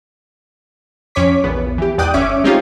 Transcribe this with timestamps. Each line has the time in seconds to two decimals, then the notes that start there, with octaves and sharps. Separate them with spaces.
1.15 F2 C#4 C#5 D6 B6
1.44 A#1 E2 B3
1.78 E3 G4
1.98 E2 G#2 D5 G5 D#6 F#6
2.14 G1 C#4 E5 D6
2.44 G#3 C4 C#4 D#4 F4 G4